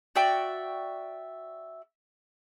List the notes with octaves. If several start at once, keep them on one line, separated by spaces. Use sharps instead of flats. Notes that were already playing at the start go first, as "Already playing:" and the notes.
F#4 D5 E5 G5